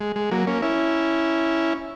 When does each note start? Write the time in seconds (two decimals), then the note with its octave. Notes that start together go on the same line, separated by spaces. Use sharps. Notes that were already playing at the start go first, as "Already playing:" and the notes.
0.01 G#3
0.16 G#3
0.31 F#3 A#3
0.47 A#3 C#4
0.62 C#4 E4